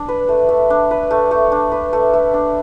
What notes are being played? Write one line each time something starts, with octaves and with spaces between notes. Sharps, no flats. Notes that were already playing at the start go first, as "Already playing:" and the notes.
Already playing: D4
B4
A3
A3
D4
B4
A3
A3
D4
B4
A3
A3
D4